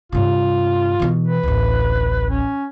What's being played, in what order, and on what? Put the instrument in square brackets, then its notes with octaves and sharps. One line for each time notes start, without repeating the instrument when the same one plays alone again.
[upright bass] G2 C3 [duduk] F4
[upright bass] B2 E3
[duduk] B4
[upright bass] D1 A1
[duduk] C#4